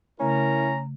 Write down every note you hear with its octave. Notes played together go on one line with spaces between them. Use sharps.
C#3 A3 C#4 E4 A#4 A#5